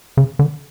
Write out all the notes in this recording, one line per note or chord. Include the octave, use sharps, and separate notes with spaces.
C#3
D3